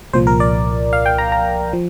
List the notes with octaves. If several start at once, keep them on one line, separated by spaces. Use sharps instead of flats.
C2 A#2 F3 C5
A#4
D5
F5
G5
A#5
A#5
F3